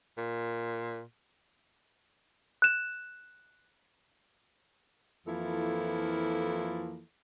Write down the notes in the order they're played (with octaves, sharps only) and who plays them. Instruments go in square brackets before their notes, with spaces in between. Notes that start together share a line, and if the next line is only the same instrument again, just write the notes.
[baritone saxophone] A#2
[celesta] F#6 E7
[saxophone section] F2 E3 F3 A#3 E4 A4